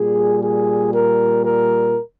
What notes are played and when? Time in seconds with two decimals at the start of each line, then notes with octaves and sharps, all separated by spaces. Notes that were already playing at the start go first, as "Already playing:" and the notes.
Already playing: A#2 G3 G#4
0.41 G#4
0.93 A#4
1.45 A#4